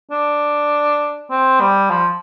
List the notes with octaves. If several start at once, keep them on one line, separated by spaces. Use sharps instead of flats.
D4
C4
G3
F3